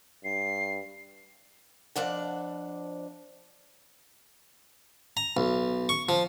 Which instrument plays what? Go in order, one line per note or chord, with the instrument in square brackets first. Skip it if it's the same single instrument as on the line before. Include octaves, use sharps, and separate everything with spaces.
[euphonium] G2 [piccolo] C7
[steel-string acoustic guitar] F2 F3 D4 F#5
[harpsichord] A#5
B1
C#6
F3